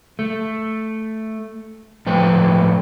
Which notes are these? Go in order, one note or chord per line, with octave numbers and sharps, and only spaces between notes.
A3
A2 F3 A3 B4 G5